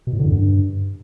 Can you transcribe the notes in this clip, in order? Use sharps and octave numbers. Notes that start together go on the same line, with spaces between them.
B2
A2
D3
F#2
G2